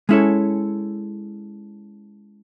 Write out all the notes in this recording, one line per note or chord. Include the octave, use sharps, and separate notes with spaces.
G#3 C#4 E4 A4 C#5